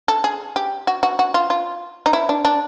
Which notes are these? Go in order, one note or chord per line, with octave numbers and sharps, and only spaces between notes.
A4
G#4
G4
F#4
F#4
F#4
F4
F4
D#4
E4
D4
D4